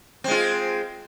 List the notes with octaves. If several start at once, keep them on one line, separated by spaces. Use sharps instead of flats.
G#3 C4 F4